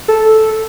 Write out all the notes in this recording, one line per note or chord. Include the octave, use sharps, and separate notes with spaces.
A4